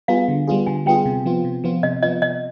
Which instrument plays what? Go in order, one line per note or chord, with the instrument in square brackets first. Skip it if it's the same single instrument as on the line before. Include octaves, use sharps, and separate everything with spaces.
[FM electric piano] G3 B3 F4 G#4 [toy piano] F5
[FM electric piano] D3
G3 B3 F4 G#4
[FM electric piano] D3 [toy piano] G#5
[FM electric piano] G3 B3 F4 G#4 [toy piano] G5
[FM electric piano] C3
F3 B3 F4
C3
F3 B3 F4
[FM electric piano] C3 [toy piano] D#5
[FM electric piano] F3 B3 F4 [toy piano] D#5
[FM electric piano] C3 [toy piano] D#5